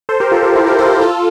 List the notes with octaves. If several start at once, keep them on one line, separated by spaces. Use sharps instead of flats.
A4 C5
G4 A#4
F4 A4
G4 A#4
E4 G4
G4 A#4
A4 C5
F4 A4